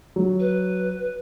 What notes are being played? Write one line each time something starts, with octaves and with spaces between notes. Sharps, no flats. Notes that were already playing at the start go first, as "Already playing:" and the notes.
F#3
B4